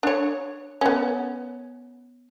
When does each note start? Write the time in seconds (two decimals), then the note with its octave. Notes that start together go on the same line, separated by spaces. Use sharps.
0.03 D4 C#5
0.81 B3 C#4